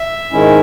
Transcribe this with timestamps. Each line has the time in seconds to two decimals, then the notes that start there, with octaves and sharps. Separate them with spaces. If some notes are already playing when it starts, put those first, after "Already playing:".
Already playing: E5
0.32 G#2 D#3 G#3 C#4 E4